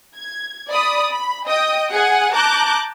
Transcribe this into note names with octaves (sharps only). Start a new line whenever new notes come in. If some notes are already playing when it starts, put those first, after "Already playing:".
G#6
D5 B5 D#6
B5
D#5 G5 D#6
G#4 F#5 G#5
A5 A#5 D6 F#6 G6